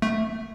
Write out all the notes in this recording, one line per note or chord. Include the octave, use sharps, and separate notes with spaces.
A3